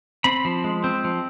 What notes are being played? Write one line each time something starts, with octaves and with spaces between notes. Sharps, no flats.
C4 B5
F3
G#3
C4
F3